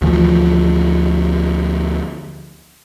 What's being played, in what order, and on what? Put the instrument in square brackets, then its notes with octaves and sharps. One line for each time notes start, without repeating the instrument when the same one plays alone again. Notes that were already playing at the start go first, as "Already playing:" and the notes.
[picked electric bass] D2 E3 F3